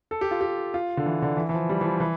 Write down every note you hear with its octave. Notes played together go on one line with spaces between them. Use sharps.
A4
G4
F4
G4
F4
D3
E3
D3
E3
E3
F3
G3
E3
F3
E3